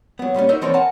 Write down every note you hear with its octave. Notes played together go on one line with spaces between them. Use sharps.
F#3 B3
A#2 G3 B3 C#4
D#4 F#4 A#4 C5 D#5 E5
E3 F3 C4 A#4 C#5 D5
A#4 F#5 G#5 A5